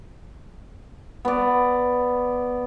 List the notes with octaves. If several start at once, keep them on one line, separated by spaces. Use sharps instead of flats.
B3 D5